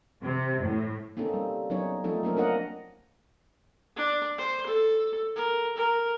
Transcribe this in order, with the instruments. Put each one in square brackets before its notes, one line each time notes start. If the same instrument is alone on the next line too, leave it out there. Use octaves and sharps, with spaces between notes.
[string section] C3
A2
[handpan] A#3 C4 C#4 D#4 A4
G3
F#3 B3 C#4 D#4 C#5
F3 A3 C4 D#4 A4
F#3 A3 A#3 C#4 A#4
A#3 C4 D4 A#4 D#5 F#5
[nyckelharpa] D4
C5
A4
A#4
A#4